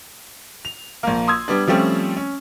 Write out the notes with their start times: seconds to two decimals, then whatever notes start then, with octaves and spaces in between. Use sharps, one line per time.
0.65 F7
1.03 A#1 A#3
1.27 C6 D#6 E6 G#6
1.48 G3 B3 D4
1.67 F3 G3 A3 C4 C#4
2.17 C#4